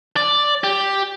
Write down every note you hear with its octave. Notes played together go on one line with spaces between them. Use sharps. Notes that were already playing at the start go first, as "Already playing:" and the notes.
D5
G4